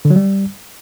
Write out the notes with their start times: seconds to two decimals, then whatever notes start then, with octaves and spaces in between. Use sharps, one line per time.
0.05 D3
0.10 F#3
0.16 G3